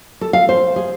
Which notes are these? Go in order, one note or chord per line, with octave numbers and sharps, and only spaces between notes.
A4
F5
C5
G#4